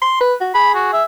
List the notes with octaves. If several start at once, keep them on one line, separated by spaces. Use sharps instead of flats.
C6
B4
F#4
G#4 B5
F#4
E5